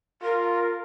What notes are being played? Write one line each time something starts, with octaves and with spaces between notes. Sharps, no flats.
F4 A#4